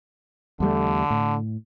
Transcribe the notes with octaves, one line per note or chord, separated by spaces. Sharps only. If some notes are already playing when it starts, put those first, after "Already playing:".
E2 D3 G3 A3
A2